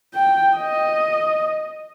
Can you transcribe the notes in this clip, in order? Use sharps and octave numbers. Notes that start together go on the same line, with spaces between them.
G5
D#5